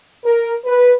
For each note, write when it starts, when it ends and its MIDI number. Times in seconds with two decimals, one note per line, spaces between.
0.24 0.57 70
0.65 0.92 71